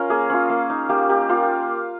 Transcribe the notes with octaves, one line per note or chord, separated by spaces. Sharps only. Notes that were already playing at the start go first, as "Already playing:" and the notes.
Already playing: C#4 F4 A#4
A#3 G#4
C#4 F4
A#3
D#4
A#3 G4
D#4 G4
A#3 F4